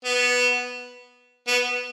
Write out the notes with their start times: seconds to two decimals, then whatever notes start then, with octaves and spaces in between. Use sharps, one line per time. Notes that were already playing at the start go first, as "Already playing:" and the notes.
0.05 B3
1.48 B3